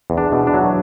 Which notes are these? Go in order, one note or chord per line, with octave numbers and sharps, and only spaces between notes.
E2
D4
B2
D4
F#3